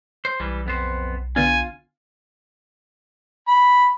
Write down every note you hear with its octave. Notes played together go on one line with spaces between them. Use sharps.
C5
B1 E3 G3
F2 B3 C5
D3 B3 D4 F4 G#5
B5